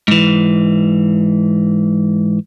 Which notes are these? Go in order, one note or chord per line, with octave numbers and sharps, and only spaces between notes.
G#2 E3